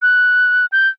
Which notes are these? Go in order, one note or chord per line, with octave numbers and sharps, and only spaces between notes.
F#6
G6